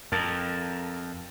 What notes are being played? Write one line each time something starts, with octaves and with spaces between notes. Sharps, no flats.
F2 A#4 A5 A6